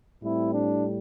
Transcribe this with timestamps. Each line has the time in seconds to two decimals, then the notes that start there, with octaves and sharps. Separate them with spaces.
0.22 A2 G3 C4 E4
0.52 D4